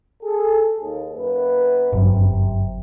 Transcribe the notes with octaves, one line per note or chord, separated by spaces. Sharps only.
G#4 A4
D#2
F#2 A#3 B4
G1 F#2 C3